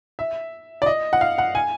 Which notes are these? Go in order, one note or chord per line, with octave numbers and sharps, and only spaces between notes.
E5
D5
D#5
F#5
F5
F#5
G#5